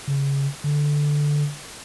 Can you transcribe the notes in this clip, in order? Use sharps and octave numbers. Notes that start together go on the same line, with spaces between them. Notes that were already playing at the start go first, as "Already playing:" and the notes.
C#3
D3